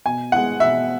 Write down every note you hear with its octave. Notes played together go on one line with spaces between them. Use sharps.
B2 G#5
G#3 B3 E4 F#5
B2 E5